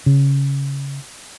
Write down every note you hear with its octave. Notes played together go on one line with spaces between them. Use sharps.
C#3